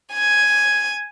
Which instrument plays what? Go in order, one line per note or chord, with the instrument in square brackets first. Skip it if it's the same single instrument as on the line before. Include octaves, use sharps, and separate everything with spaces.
[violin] G#5 G#6